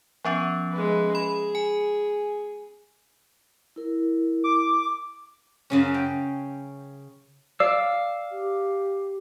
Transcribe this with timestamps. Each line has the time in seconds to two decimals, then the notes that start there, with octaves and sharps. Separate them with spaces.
0.25 F3 B3 C#4
0.72 G#3 B4
1.15 G#4 B5
1.55 G#5
3.76 E4 A#4
4.44 D6
5.70 F#2 C#3 C#4
5.94 G5
7.60 D5 F5 E6
8.32 G4